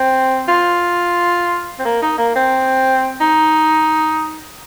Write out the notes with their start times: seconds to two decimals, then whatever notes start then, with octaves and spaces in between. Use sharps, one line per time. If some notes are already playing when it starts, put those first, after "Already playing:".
Already playing: C4
0.48 F4
1.79 C4
1.85 A#3
2.02 D#4
2.18 A#3
2.36 C4
3.21 D#4